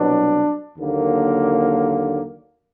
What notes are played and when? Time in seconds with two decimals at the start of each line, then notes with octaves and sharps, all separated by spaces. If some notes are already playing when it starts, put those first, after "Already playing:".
Already playing: C2 B2 F#3 D4
0.78 D#2 D3 F#3 A#3